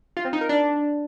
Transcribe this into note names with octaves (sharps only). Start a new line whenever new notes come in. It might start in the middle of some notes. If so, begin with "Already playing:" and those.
F4
C4
D#4
A#4
D4